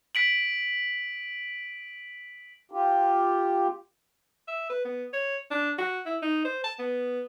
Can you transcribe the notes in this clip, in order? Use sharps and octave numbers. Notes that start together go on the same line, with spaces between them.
B6 D7 F#7
F4 G4
E5
B4
B3
C#5
D4
F#4
E4
D#4
C5
A5
B3